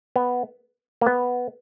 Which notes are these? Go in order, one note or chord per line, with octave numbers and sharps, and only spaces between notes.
B3
A#3
B3